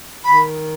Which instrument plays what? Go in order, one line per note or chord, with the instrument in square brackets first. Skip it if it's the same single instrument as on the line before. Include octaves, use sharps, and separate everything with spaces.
[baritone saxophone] D#3 [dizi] B5